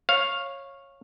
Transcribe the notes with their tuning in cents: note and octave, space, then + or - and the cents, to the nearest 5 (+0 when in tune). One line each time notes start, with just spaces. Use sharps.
C#5 -15 F5 +0